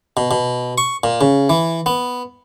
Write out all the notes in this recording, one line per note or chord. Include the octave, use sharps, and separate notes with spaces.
B2
B2
C#6
A#2
C#3
E3
B3